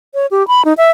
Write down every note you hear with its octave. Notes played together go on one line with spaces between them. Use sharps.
C#5
G4
B5
D#4
E5